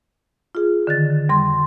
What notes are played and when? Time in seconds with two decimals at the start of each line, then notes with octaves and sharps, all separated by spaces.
0.55 F4 G#4
0.87 D3 D#3 A6
1.29 F2 G3 C6